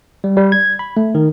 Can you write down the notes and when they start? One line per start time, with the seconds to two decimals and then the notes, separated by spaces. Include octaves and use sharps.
0.24 G3
0.37 G3
0.52 G#6
0.79 B5
0.97 A3
1.15 D#3